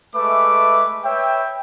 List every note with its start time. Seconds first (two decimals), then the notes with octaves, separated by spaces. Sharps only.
0.15 G#3 A3 B4 E5 D6
1.04 B4 C#5 E5 G5